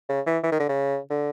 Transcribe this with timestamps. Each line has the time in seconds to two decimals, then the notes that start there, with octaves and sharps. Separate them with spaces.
0.09 C#3
0.27 E3
0.44 E3
0.52 D#3
0.60 D3
0.69 C#3
1.10 D3